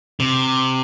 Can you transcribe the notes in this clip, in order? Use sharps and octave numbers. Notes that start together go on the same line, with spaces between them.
C3